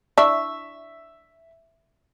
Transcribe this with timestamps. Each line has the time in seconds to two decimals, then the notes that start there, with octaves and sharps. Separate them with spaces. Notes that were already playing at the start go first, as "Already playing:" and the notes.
0.18 D4 E4 E5 C#6 E6